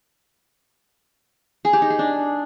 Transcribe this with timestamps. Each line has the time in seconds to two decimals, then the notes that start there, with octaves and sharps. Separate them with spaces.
1.65 G#4
1.73 G4
1.82 D#4
1.90 G#4
1.99 D4